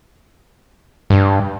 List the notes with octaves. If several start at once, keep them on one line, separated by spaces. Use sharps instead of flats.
G2